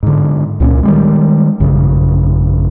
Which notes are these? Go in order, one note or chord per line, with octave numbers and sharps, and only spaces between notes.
G#2 D3
C#2 A#2 G#3 C#4
D#3 G3 G#3
A1 F#2 C#3